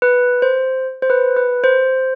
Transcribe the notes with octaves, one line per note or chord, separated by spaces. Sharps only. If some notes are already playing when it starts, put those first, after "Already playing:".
B4
C5
C5
B4
B4
C5